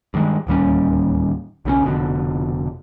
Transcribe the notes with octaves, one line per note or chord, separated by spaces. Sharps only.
G2 D#3 G#3
D1 D#2 G3 C#4
B1 C#3 C4 C#4
F1 B2 D3